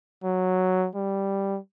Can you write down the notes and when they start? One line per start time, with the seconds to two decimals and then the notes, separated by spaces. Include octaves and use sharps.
0.24 F#3
0.95 G3